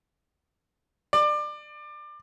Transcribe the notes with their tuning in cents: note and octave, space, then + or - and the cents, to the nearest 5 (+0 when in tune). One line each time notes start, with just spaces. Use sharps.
D5 +25